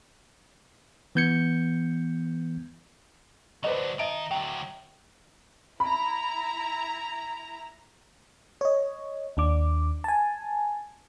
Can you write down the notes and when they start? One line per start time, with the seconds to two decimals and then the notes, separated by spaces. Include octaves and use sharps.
1.15 E3 B3 G6 G#6 C#7
3.64 F#3 D4 B4 C5 D#5
3.99 D#3 D#4 D#5 E5 A5 D7
4.31 D2 F#3 G5
5.80 E4 A#5 B5
8.61 C#5 D#5
9.37 D#2 D4 D6
10.04 G#5 A5